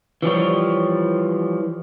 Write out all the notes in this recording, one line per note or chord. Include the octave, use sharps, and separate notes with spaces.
E3 F3 G3 C#5